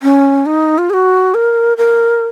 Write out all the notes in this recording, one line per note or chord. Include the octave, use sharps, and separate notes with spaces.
C#4
D#4
F4
G#4
F#4
A#4
A#4